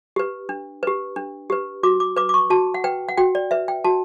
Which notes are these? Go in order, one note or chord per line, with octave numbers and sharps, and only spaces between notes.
G4 B4
D4
G4 B4
D4
G4 B4
F#4 D6
D6
B4 D6
D6
C#6
F#4 A5
F#5
B4 G5
F#5
F#4 G5
D5
B4 E5
G5
F#4 A5